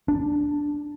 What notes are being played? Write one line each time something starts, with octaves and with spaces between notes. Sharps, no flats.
D4